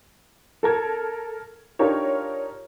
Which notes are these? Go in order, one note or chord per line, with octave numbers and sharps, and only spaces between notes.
A4 A#4 G#6
D4 D#4 F4 G4 A#4 C#5